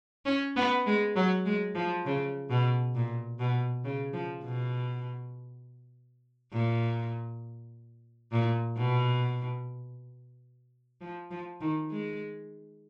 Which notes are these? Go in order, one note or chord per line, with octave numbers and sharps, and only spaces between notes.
C#4
B3
G#3
F#3
G#3
F3
C#3
B2
A#2
B2
C#3
F3
B2
A#2
A#2
B2
F3
F3
D#3
G#3